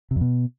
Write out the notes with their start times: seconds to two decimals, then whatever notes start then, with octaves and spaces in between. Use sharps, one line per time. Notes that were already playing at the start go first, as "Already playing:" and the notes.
0.11 C3
0.16 F2
0.21 B2